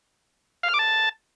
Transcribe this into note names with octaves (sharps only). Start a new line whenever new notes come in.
F5
F6
D6
A5